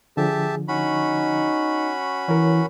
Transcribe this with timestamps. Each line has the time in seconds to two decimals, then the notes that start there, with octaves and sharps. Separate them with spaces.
0.17 D3 F3 G4 G#4 E5 A5
0.68 C#4 D#4 F#4 B5
2.29 E3 A#4 C#5